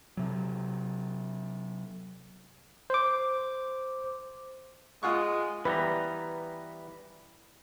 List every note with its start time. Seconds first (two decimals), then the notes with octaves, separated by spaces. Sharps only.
0.17 C3 F#3
2.90 C5 D6
5.03 G#3 F4 F#5 C#6
5.65 E3 G3 B3 B4 A#5